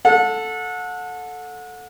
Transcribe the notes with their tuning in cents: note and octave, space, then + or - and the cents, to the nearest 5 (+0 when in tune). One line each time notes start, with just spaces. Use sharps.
A4 +0 F#5 -30